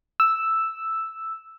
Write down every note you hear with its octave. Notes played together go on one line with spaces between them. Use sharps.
E6